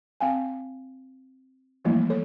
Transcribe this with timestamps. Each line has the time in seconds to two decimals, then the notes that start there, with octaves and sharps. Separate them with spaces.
0.21 C4 F5 G5 G#5
1.85 E3 F3 G3 A3 A#3 E4
2.10 A4 C#5